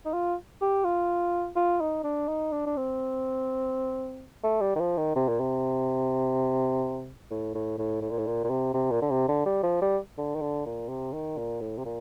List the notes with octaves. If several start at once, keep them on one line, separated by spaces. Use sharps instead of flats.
D#4
F4
G4
F4
F4
D#4
D4
D#4
D4
D4
C4
A3
G3
D#3
F3
D#3
C3
A#2
C3
A2
A2
A2
A2
A#2
A2
A#2
A#2
C3
C3
A#2
D3
C3
D3
G3
F3
G3
D3
D#3
D3
A#2
C3
D#3
A#2
A2
C3
A#2